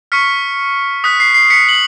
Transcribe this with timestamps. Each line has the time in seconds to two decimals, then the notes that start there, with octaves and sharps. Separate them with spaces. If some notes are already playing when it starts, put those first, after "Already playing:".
0.12 C#6 F6 B6 C#7
1.04 D#6 F#6 B6
1.20 C7
1.34 C7
1.50 B6 C#7
1.69 F#7